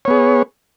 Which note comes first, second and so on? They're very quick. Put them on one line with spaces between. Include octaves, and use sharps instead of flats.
C#5 B3 G#4